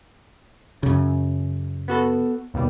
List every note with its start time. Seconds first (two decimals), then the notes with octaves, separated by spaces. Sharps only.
0.83 F#2 C#3
1.88 B3 F#4 A4
2.54 D#2 B2 G3